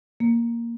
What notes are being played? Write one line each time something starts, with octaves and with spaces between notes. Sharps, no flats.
A#3